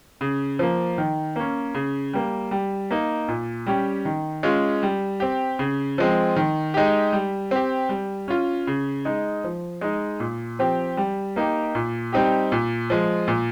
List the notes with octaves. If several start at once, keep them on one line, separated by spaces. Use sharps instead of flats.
C#3
F3 A#3
D#3
A#3 C#4
C#3
G3 A#3
G3
A#3 D#4
A#2
G3 C#4 G4
D#3
G#3 C#4 F4
G3
C4 G4
C#3
F3 G#3 C4
D#3
G#3 D#4 G4
G3
C4 G4
G3
C#4 F4
C#3
G#3 D#4
F3
G#3 D#4
A#2
F3 C4 G4
G3
A#3 D#4 G4
A#2
G3 C4 D#4 G4
A#2
F3 G#3
A#2